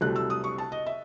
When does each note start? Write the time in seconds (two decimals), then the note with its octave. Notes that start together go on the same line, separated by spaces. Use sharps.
0.01 C2 C3 F#3 A3 F#6
0.16 E6
0.30 D#6
0.44 C#6
0.58 A5
0.72 D#5
0.86 E5